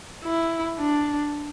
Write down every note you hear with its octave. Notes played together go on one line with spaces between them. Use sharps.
E4
D4